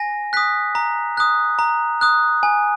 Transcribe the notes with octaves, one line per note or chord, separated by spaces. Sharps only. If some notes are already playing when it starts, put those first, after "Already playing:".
Already playing: G#5 A#6
D#6 F#6 B6
A#5
D#6 F#6
A#5
D#6 F#6
G#5